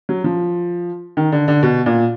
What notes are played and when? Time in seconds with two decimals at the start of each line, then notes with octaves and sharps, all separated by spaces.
0.09 F#3
0.24 F3
1.17 D#3
1.32 D3
1.48 D3
1.63 B2
1.86 A#2